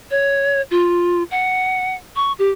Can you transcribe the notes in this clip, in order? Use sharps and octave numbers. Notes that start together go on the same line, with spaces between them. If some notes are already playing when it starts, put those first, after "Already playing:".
C#5
F4
F#5
C#6
G4